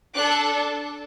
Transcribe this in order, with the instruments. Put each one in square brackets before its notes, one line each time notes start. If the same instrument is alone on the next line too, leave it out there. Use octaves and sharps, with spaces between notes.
[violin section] D4 A4 D6 F#6